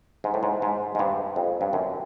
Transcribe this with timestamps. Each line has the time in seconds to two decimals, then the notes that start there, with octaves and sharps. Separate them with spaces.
0.24 G#2
0.34 A2
0.43 G#2
0.62 G#2
0.95 G#2
0.99 G2
1.36 F2
1.61 G2
1.73 F#2